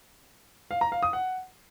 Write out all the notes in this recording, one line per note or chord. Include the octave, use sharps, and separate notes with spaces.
F5
A#5
F5
D#6
F#5